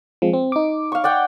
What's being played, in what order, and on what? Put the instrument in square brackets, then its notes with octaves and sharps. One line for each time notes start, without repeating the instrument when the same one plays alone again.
[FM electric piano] F3 G#3 C4
C4
D#4 D6
[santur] F5 C#6
D5 F#5 G5